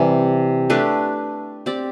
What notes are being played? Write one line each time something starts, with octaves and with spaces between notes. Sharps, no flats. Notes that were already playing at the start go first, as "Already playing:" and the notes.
Already playing: C3 E3 G3
A3 D4 G4 B4
C4 G4 D5